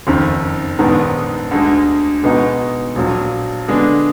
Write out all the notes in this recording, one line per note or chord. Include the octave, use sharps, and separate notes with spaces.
F#1 F2 D#3
A#1 G#2 D#3 G#3 B3
D2 D3 G#3
B2 G#3 B3 D#4 F#4
A#1 A#2 F#3
D3 G#3 B3 D4